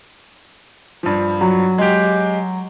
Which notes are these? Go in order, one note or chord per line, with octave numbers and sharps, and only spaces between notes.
G2 F3
F#3
G#3 G4